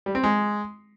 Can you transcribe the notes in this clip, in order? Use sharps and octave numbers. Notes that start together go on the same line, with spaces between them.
G3
C4
G#3